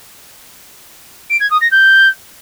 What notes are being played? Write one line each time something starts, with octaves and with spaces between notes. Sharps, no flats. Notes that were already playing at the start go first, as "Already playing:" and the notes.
D7
G#6
D#6
A#6
G6